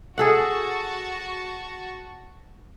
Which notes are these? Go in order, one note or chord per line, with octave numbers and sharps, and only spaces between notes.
F#4 G#4 A4 F#5 A5 C#6